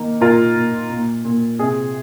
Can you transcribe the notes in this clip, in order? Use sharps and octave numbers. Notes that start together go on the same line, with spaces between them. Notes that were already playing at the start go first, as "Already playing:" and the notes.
Already playing: D#3 A#3
A#2 F4 A#4
A#2
A#2
A#2
C3 G#4